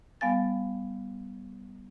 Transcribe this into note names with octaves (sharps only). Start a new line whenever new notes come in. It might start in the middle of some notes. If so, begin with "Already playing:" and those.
G3 B3 F5 G#5 A6